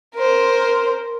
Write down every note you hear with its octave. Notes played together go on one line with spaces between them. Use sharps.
A#4 C5